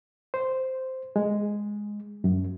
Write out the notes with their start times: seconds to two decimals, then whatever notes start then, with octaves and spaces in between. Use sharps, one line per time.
0.34 C5
1.16 G#3
2.24 F#2